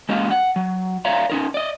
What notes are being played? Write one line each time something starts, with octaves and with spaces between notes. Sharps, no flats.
G#3 A#3 C#4 G4 D#5 F5
F#5
F#3
C#5 D5 E5 F5 A#5
C#4 D#4 A#4
D5 D#5